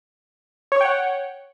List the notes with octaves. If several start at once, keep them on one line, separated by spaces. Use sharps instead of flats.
C#5 F#5 G5 C#6